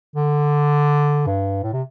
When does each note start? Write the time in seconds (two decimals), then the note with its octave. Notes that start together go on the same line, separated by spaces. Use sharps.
0.16 D3
1.26 G2
1.63 A2
1.73 C3